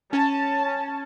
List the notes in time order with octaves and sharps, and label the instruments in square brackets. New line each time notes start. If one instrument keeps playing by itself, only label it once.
[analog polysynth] C#4 [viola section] A5